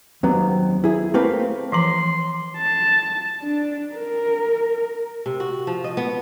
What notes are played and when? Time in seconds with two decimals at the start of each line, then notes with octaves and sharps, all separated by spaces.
0.23 D#2 F#3 B3 C4
0.84 E4 G#4
1.14 A3 A#3 C4 G4 B4
1.72 E3 F3 A#5 C6
2.58 A5
3.43 D4
3.95 A#4
5.26 C3
5.40 F#4
5.67 F3
5.84 D#5
5.97 B3